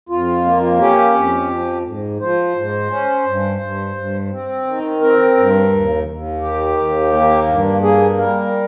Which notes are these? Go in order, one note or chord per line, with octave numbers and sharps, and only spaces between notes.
F2 F4
A#3
C#4 G4
F2
F3
G#2
F3 C5
G#2
C#4
G2
G2
G2
C4
D#3
C4 A#4
G2
D#2
D#2
D#3 G4
D#2
A#3
G2
A#3 G#4
G3 A#4